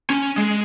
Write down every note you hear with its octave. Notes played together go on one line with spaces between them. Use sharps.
C#4
G#3